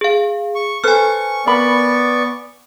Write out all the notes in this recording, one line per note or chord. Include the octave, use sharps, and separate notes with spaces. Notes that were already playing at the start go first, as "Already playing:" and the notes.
G#4 F5
C#6
A4 B4 C5 G#5 C#6 F6
B3 A#4 D5 B5 C#6